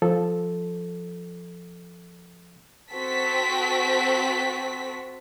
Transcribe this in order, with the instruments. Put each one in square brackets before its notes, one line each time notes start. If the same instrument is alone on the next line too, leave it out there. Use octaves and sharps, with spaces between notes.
[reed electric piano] F3 A4
[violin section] C4 F#4 A4 B6